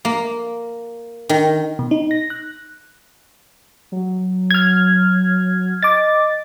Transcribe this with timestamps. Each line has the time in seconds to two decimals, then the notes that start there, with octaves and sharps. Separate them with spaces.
0.05 A#3
1.29 D#3
1.79 B2
1.91 D#4
2.11 A#6
2.30 F#6
3.92 F#3
4.51 F6 G#6
5.83 D#5 D6 A6